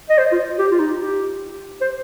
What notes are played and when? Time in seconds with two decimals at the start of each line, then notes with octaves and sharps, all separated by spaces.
0.09 D#5
0.18 C5
0.32 F4
0.59 G4
0.71 F4
0.79 D#4
0.99 G4
1.81 C5